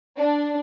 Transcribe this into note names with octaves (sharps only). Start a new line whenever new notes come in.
D4